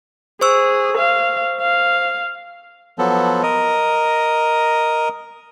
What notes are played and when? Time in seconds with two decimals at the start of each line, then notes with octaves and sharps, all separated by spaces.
0.41 G#4 C5 C#6 E6
0.97 F5
1.61 F5
2.99 F3 F#3 B3 A4
3.43 A#4 D#5